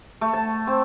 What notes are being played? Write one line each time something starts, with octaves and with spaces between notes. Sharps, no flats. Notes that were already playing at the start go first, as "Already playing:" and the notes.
A3
A5
C4